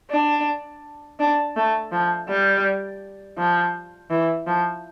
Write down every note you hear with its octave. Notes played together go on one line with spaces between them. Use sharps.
D4
D4
A3
F3
G3
F3
E3
F3